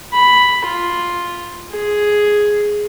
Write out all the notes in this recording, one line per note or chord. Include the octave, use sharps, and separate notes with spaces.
B5
F4
G#4